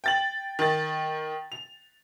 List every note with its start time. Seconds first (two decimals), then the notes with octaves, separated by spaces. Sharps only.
0.04 G5 A6 F#7
0.59 D#3 A6
1.52 F7